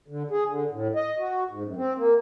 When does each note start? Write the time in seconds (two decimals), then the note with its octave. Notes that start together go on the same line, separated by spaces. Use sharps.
0.08 D3
0.31 G#4
0.47 D3
0.71 A2
0.95 D#5
1.19 F#4
1.49 G#2
1.64 F#2
1.76 C4
1.97 A#3